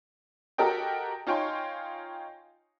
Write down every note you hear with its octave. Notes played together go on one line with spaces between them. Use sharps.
F#4 G4 A4 A#4 D#5 G5
D#4 F4 C#5 G5 G#5 C6